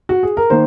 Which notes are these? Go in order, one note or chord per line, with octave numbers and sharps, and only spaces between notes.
F#4
G#4
A#4
D#3 A#3 C5